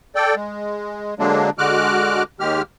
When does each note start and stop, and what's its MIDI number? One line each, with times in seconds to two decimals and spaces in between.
0.15 0.35 69
0.15 0.35 74
0.15 0.35 79
0.35 1.14 56
1.19 1.50 50
1.19 1.50 54
1.19 1.50 56
1.19 1.50 58
1.19 1.50 62
1.58 2.23 50
1.58 2.23 56
1.58 2.23 66
1.58 2.23 86
1.58 2.23 89
1.58 2.23 90
2.40 2.62 39
2.40 2.62 51
2.40 2.62 56
2.40 2.62 67
2.40 2.62 89